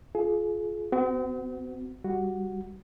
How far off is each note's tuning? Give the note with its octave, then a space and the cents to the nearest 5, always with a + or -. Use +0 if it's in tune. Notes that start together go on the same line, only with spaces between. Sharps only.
F4 +0 G#4 +35
C4 -40 F#4 +15
G3 +0 F#4 +0